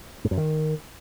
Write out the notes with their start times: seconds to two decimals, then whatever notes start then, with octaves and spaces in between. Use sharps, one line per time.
0.25 G#2
0.31 F#2
0.38 D#3